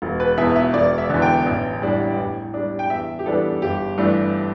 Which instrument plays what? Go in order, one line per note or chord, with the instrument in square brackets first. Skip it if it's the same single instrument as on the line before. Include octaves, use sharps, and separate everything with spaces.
[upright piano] E1
B4
E2 B2 E5
E5
E1 D5
E5
E2 D3
G5
A1
A2 G3 D4
A2
G3 D4
G5
E2 E5
G4
E3 G3 B3 D4 A4
G1 G4
G2 E3 A3 D4